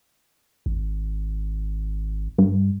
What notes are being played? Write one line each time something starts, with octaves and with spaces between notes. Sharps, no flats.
G#1
G2